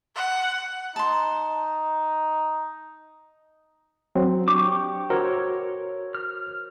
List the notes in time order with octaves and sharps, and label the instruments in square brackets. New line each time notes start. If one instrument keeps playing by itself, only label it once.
[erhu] F#5
[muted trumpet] D#4 [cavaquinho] A5 C6
[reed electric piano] F#3 C4
[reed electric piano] D4 [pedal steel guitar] G4 C#6 D6
[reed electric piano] F#4 A#4 C5 [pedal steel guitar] A4 C#5
[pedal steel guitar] F6